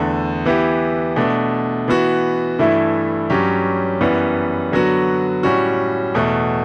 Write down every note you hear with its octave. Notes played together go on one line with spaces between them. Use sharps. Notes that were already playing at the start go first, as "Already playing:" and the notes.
Already playing: E2 D3 A3
E3 B3 E4 G4
B2 A3 D4
E3 B3 F#4
G2 E3 A3 E4
G2 F#3 C#4 G4
F#2 E3 G3 B3
D3 F#3 B3 F#4
A2 G3 C#4 F#4
E2 B2 A3